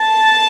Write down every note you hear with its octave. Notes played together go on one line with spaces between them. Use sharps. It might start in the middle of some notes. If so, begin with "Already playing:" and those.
Already playing: A5